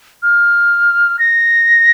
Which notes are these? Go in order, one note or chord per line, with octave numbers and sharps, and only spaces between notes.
F6
A#6